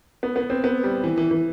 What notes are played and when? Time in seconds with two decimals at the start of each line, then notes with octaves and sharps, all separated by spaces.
0.23 B3
0.36 B3
0.50 C4
0.64 B3
0.83 G3
1.04 E3
1.18 E3
1.31 E3